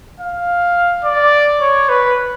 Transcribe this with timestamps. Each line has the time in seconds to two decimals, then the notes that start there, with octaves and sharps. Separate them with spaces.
0.20 F5
1.04 D5
1.61 C#5
1.89 B4